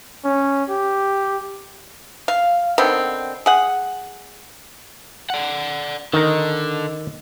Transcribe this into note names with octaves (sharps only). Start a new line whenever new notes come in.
C#4
G4
F5
D3 D#3 B3 C4
G#4 F#5
D5 F#5
D3 D#3 D#4